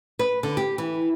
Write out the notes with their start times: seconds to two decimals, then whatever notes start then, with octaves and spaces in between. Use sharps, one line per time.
0.19 B4
0.43 D3
0.57 G4
0.78 E3